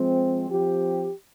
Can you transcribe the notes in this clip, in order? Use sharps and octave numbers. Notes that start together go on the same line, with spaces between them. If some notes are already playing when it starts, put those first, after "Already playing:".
Already playing: F3 G#3 C4
F3 C4 G4